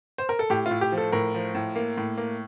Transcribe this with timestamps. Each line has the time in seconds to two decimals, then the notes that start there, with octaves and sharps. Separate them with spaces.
0.18 C5
0.29 A#4
0.39 A4
0.50 A2 G4
0.66 F4
0.71 A2
0.81 G4
0.92 F3
0.98 A4
1.12 A2 A#4
1.34 F3
1.55 A2
1.76 A#3
1.98 A2
2.17 A#3